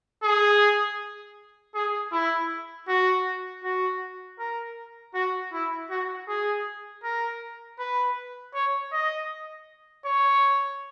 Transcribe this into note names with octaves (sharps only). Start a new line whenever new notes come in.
G#4
G#4
E4
F#4
F#4
A#4
F#4
E4
F#4
G#4
A#4
B4
C#5
D#5
C#5